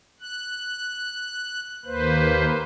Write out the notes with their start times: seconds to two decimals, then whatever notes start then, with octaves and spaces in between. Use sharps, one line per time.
0.20 F#6
1.85 D#2 A#3 B4 C5